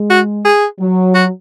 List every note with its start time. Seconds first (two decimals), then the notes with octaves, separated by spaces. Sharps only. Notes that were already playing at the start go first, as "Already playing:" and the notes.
Already playing: G#3
0.10 F#4
0.45 G#4
0.80 F#3
1.14 F#4